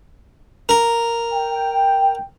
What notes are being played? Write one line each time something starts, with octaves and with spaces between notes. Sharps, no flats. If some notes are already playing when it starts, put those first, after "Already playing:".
A#4
G5